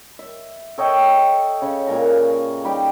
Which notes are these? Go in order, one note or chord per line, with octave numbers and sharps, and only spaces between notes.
E5
A4 C#5 D#5 G5
C#3
A#2 G#5 A#5
G3 D#4 G4